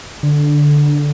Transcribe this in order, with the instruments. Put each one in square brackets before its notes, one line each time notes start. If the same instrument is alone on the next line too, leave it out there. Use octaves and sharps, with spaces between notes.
[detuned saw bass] D3